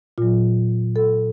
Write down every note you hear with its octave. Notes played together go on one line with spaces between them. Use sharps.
A#2 F#3 F4
A4